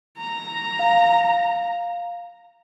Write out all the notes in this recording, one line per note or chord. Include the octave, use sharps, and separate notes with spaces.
A#5
F5